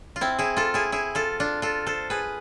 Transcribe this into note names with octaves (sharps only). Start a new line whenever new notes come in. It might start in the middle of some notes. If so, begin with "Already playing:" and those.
F4
C4 E4
E4 G#4
F4 A4
E4 G#4
E4 G#4
F4 A4
D4 F4
F4 A4
A4 C5
G#4 B4